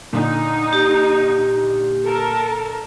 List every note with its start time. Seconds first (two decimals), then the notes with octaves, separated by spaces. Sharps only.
0.13 A#2 D3 D#4
0.73 G4
2.06 A4 A#4 A5